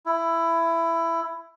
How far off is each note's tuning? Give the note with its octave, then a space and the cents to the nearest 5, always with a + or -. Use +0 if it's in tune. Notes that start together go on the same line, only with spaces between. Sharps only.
E4 +15